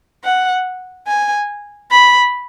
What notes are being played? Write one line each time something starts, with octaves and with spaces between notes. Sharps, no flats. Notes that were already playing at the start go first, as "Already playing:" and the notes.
F#5
G#5
B5